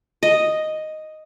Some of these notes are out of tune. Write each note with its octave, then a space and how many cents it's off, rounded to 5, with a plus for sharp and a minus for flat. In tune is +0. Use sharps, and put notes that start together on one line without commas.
D#5 +0